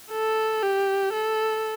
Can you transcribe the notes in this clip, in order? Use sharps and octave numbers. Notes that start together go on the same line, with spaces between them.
A4
G4
A4